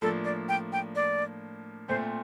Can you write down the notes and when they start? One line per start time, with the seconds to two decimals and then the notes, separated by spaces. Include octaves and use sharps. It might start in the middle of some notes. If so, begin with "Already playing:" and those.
0.02 A2 F3 A#3 D4 A4
0.25 D5
0.49 G5
0.73 G5
0.95 D5
1.88 A#2 A3 C4 C5